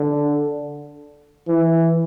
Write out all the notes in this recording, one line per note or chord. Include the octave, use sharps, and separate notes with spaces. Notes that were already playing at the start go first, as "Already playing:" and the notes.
Already playing: D3
E3